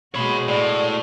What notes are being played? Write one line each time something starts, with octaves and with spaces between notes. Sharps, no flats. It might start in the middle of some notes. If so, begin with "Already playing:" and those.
B2 G#3 F#4 C#5 B5
A2 D5